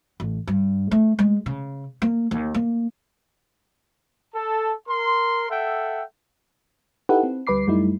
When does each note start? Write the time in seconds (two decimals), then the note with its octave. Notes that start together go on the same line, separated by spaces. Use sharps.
0.20 A1
0.47 G2
0.91 A3
1.19 G#3
1.46 C#3
2.02 A#3
2.31 D#2
2.54 A#3
4.34 A4 A5
4.89 A#4 C6
5.50 A4 E5 F#5 G5
7.09 D#4 E4 G4 A4 B4 F#5
7.23 C4
7.47 D2 G3 B4 B5 D6 C7
7.67 F#2 G3 A3 D#4 E4